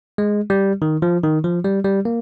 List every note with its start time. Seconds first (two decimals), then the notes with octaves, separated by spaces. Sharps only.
0.18 G#3
0.50 G3
0.82 D#3
1.02 F3
1.23 D#3
1.44 F3
1.64 G3
1.85 G3
2.05 A#3